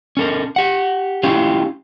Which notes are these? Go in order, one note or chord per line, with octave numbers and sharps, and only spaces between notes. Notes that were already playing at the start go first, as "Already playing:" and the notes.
C#4 A4 A#4
G4 F#5
C#4 E4 F4 G4